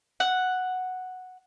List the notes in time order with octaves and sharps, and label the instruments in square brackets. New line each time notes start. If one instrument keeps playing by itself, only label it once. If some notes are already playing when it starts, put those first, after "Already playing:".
[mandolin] F#5